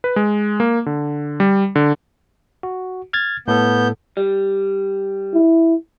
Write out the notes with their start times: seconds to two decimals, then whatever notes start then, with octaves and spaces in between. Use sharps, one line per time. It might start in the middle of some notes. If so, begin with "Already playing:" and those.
0.04 B4
0.16 G#3
0.60 A#3
0.86 D3
1.40 G3
1.76 D3
2.63 F#4
3.13 F6 G#6 A6
3.48 A2 B3 A4 G6
4.17 G3
5.34 E4